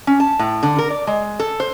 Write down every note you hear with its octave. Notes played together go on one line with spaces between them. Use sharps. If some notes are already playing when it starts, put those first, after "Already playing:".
C#4
A5
A2
D3
A#4
D5
G#3
A4
C5